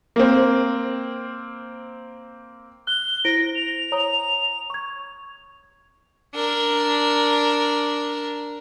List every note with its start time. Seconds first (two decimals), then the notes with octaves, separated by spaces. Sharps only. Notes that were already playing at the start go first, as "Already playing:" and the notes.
0.16 A#3 C4
2.87 F#6 G7
3.25 E4 C5 A#6 D7
3.55 F7
3.92 C#5 A#5 D#6
4.70 C#6 G#6
6.35 D4 A#4